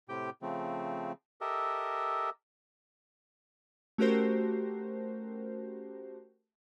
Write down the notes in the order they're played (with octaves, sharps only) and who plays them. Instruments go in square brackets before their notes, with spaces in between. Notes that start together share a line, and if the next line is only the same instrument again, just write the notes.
[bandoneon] A2 C3 G4 G5
C#3 F3 A3 C4
G4 A4 A#4 D#5 E5
[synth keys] A3 C#4 F#4 G4 A#4 C5